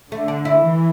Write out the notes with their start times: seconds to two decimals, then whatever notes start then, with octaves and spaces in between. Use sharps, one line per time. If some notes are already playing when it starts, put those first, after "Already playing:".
0.12 D3 A3
0.28 D4
0.45 E4
0.62 E3